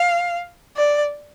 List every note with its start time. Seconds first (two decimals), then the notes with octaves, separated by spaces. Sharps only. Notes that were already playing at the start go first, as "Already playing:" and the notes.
Already playing: F5
0.77 D5